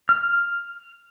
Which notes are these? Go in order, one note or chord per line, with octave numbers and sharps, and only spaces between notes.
F6